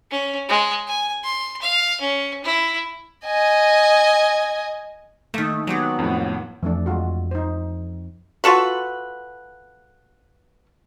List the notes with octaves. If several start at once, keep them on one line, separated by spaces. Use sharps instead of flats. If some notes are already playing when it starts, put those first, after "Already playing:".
C#4
G#3
G#5
C6
F5
C#4
E4
D#5 G#5
D#3 A3 A#3
F#3 G#3 B3 D#4 G4
F2 A2
F2 E3 A3 D4
G#3 F4 F#4
D#4 C5
F4 F#4 A4 B4